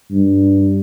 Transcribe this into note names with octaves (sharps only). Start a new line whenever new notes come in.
G2